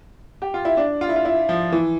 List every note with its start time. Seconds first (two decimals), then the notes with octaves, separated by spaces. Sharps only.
0.42 G4
0.54 F4
0.65 E4
0.77 D4
1.01 F4
1.09 E4
1.16 F4
1.25 E4
1.49 F3
1.72 E3